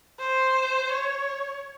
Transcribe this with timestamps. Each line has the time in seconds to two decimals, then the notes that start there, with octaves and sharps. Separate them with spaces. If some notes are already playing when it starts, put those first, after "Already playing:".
0.20 C5
0.92 C#5